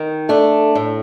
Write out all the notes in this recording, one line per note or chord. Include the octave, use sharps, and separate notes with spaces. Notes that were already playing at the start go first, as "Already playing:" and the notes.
Already playing: D#3
A3 D4
A2